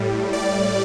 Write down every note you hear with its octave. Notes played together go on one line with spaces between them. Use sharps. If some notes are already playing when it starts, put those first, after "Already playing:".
Already playing: A2 G3
D5